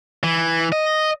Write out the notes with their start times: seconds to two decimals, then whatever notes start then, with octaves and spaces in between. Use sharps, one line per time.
0.23 E3
0.72 D#5